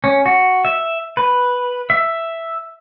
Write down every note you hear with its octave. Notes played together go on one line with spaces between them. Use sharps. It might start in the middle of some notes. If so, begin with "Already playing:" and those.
C#4
F#4
E5
B4
E5